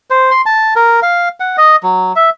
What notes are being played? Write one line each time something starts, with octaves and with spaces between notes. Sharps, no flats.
C5
C6
A5
A#4
F5
F#5
D#5
F#3
E5